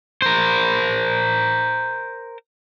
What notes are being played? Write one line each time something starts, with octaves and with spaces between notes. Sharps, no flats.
A#4 C5